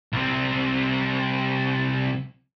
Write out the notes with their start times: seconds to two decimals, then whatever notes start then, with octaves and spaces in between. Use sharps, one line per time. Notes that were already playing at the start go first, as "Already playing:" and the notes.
0.13 C2 C4